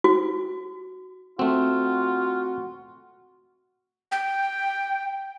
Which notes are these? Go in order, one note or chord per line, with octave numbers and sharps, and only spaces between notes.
F#4
A3 C4 F4 F#4
G5